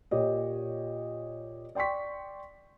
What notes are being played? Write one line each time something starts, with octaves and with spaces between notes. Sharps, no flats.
A#2 G4 C#5 D#5
D5 G5 C6 C#6 B6